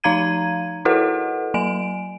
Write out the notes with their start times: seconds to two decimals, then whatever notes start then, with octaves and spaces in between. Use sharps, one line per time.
0.04 F3 D#4 F5 A#5 G#6 D#7
0.85 E4 F#4 A4 B4 D#5 F#5
1.54 F#3 G#5 D7